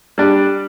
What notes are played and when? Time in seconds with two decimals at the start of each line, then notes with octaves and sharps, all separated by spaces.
0.18 G3 D4